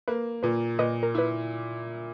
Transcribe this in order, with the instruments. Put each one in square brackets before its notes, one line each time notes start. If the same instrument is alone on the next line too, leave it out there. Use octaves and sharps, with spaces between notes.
[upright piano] A#3 [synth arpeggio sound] B4
[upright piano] A#2 [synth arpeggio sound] B4
[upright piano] A#2 [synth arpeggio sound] B4 D#5
[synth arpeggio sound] A#4
[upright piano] E4 [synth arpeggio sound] B4